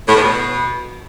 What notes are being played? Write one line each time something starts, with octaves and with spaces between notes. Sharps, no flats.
A2
E2
B2